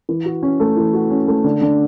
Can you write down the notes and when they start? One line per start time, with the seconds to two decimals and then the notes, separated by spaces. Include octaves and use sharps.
0.09 E3
0.26 F#4
0.43 C#4
0.60 A3
0.77 E3
0.94 F#4
1.10 C#4
1.28 A3
1.44 D3
1.61 D3